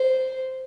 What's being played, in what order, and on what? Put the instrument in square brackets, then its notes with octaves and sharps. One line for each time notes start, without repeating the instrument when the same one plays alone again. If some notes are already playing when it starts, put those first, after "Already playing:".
Already playing: [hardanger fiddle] C5